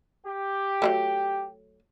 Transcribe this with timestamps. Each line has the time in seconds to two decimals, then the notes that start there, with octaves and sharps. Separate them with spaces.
0.25 G4
0.82 F#3 G3 A3